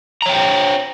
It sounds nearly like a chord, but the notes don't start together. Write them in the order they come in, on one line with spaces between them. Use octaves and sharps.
A#5 C#5 G5 C5